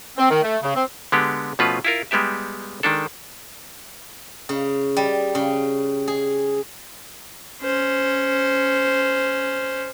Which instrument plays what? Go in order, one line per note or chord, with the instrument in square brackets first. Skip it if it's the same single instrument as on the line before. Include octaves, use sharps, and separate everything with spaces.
[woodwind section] C4
D#3
A3
C#3
C4
[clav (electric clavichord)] D3 G#3 B3 G4
B2 F3 A3 C#4 F4 B4
E4 F4 A#4
G3 G#3 B3 G4 E5
D#3 G#3 D4 A4
[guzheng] C#3
G3
C#3
G#4
[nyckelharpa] C#4 C5